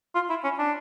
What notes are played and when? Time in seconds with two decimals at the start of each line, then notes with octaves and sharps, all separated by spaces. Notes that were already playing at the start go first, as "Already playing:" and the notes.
0.15 F4
0.30 E4
0.44 C#4
0.59 D4